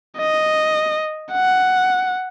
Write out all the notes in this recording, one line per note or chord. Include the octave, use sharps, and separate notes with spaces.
D#5
F#5